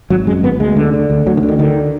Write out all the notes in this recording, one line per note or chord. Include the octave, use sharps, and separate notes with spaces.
G#1 F#3
F#2 G#3
G#1 B3
D2 G#3
D3
D3
D2
D2 F#3
D#3
D3
D#3
D3 D#3